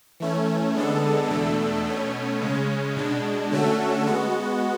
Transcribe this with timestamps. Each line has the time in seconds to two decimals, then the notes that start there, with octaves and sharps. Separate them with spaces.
0.20 E3 A3 C#4
0.75 D3 G#3 B3 D4 A4
1.30 E2 B2 A3 D4 A4
1.86 B2 A3 C#4
2.41 C#3 G#3 C#4
2.96 B2 G#3 D4
3.51 D3 A3 C#4 F#4 A4
4.07 G#3 B3 F#4